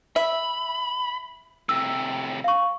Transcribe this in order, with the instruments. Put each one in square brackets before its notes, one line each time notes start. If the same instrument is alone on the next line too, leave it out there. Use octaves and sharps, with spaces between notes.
[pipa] E5 [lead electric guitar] B5
[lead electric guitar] A2 C3 [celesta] E6
[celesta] F5 C#6